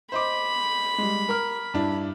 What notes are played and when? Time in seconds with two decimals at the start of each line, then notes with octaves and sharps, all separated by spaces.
0.12 C5 D#5 B5 D6
0.98 G3 G#3
1.29 A#4 F6
1.74 G2 D4 E4